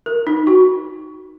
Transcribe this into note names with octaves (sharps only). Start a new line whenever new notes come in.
A#4
D#4
F#4